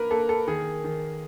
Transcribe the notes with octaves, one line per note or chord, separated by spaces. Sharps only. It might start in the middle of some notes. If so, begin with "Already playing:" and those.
Already playing: A#3 A#4 B4
A#3 A4
A4
D#3 G#4
D#3